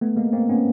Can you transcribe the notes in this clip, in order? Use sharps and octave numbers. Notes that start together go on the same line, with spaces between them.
A3 B3
G#3 A#3
A#3 C4
B3 C#4